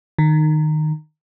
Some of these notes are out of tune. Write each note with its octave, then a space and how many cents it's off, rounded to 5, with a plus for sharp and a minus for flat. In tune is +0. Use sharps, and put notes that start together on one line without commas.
D#3 -15